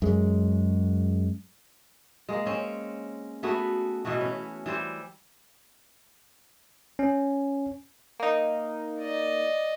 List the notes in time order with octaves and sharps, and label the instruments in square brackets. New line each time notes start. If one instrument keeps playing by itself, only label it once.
[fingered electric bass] F#2 G#3
[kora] G#3 A#3
C4 C#4
A3 B3 F#4 G#4
B2 E3 B3 F#4
C#4
E3 G3 C5
[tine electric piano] C#4
[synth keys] A#3 D#4
[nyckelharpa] D5 D#5